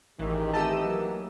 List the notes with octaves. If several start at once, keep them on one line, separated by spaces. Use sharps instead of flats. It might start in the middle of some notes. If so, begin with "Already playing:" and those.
A1 D#3 E3 G#3 G4
E3 A3 D#4 G4 D#5 A5 E6
F#3 A#3